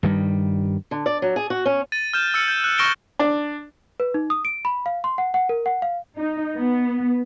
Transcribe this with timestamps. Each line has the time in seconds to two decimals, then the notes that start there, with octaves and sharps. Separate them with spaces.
0.03 G2 D#3 G3
0.91 D3
1.06 D5
1.22 F#3
1.36 G#4
1.50 F#4
1.66 C#4
1.92 A6 D#7
2.13 F6 G6 E7
2.34 E6 F6 C#7
2.48 G6
2.64 F#6
2.78 C#6 F6 A#6 D7 E7 G7
3.19 D4
4.00 B4
4.14 D#4
4.30 D#6
4.45 D7
4.65 B5
4.86 F5
5.04 C6
5.18 F#5
5.34 F#5
5.49 A#4
5.66 F#5
5.82 F5
6.17 D#4
6.56 B3